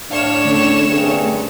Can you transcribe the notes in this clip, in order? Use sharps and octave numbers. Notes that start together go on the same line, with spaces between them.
A2 D4 C#5 F5 E7
D3 A3 C#4
G2 C3 G#4